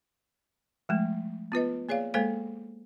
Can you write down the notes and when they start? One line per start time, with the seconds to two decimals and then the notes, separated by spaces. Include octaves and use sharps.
0.89 F3 G#3 A3
1.52 B3 F4 B4 D#5
1.89 A#3 G#4 C#5 D5 F5
2.14 G#3 A#3 A4 C5 F5